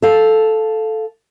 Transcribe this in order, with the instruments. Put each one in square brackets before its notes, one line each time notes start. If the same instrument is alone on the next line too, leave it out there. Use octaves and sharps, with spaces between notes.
[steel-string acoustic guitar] A4 F5